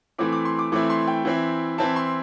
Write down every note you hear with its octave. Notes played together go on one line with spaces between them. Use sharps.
E3 A3 C4 E4 D6
D6
C6
D6
E3 A3 C4 E4 D6
C6
G5
E3 C4 E4
E3 C4 E4 A5
C6